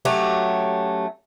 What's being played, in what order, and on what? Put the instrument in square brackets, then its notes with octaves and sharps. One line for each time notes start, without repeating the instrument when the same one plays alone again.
[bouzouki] F#3 A3 C#4 G4